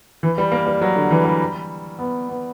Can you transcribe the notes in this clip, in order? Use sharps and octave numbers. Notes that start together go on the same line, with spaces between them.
E3
G3
A#3
G3
F#3
D3
E3
G3
B3
B3